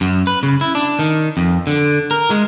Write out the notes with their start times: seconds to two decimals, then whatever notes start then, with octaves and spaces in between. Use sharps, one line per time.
0.01 F#2
0.27 B4
0.43 C#3
0.61 E4
0.75 D4
0.99 D#3
1.37 F2
1.67 D3
2.11 A#4
2.30 G#3